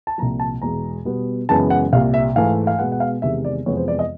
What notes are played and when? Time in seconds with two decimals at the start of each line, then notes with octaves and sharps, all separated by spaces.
0.07 A5
0.18 C2 A#2 F3 A#5
0.40 A5
0.62 E2 B2 G#3 A#5
1.05 B2 G3 B3
1.49 F#2 C#3 E3 G#3 B3 A5
1.70 F#5
1.93 C2 A#2 G3 F5
2.14 E5
2.35 G#2 E3 A3 F5
2.67 F5
2.79 B2 G#3 B3 F#5
2.92 F#5
3.00 F5
3.22 E2 C3 D#3 G#3 E5
3.45 D5
3.66 F2 C3 E3 G#3 B3 C#5
3.77 C5
3.88 D5
3.99 D#5